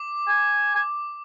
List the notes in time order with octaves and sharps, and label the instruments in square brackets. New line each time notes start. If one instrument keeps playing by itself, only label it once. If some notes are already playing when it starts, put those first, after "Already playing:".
Already playing: [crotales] D6
[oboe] G#5
G#5